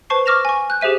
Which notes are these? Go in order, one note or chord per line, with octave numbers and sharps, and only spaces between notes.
B4 C5 A5 C#6 C7
C#6 D6 F6 A#6 E7 F7
G#5 C#6
F#6 G6
G4 G#4 C5 E5 D#7